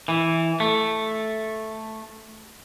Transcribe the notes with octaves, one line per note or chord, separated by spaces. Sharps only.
E3
A3